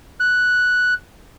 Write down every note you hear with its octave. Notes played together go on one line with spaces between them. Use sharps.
F#6